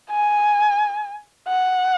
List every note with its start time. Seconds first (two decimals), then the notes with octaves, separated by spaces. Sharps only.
0.11 G#5
1.48 F#5